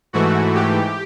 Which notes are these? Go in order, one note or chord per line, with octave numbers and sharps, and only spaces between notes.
G#2 E3 A3 F#4
G4